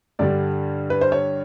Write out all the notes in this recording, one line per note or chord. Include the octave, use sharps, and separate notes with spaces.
G2 D3 G3 D5
B4
C5
C#5